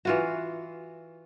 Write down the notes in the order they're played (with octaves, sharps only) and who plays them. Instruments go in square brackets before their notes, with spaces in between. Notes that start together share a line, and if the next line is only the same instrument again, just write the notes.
[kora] E3 F4 F#4